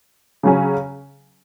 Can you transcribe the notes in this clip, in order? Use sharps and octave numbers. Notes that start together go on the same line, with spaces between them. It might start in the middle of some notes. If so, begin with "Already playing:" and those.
C#3 F#3 C#4